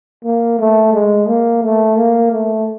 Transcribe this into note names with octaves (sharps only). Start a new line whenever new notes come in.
A#3
A3
G#3
A#3
A3
A#3
A3